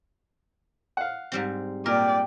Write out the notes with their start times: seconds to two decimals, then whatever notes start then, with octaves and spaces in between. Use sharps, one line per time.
0.97 F5 F#5
1.32 G#2 G3 C4
1.86 A#2 A#4 D5 G5